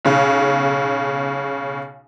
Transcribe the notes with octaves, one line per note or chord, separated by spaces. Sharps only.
B1 C#3